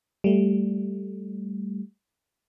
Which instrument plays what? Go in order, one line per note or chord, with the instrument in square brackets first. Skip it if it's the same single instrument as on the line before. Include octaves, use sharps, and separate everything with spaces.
[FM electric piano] G3 A3